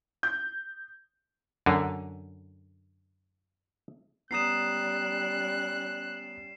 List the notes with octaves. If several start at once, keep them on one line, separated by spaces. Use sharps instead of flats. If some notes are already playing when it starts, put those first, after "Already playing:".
G6
F#2 D3
G3 B3 C#4 A#5 D#6 F#6 C7 E7